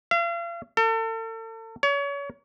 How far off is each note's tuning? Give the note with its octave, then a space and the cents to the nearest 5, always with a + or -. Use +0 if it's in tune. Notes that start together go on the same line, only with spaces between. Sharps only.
F5 -40
A4 +40
C#5 +30